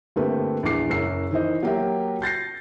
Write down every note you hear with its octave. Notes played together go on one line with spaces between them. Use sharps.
G1 A3 A#3 C4 G4 B4
A#1 E2 G#4 D6 C7
F#1 F#2 E6 C7
D#3 E3 C5 D#5
F#3 A#3 G4 A#4 E5
G6 A6 A#6 C7